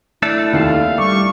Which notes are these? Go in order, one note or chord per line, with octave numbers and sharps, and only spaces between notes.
A3 D4 E4 A4
F1 D#2 F5 C7
G3 C#6 D6